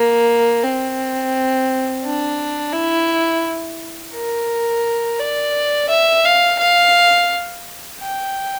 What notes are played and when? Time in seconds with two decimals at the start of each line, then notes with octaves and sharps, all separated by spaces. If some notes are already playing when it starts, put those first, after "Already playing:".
Already playing: A#3
0.63 C4
2.04 D4
2.73 E4
4.13 A#4
5.19 D5
5.89 E5
6.25 F5
6.59 F5
8.00 G5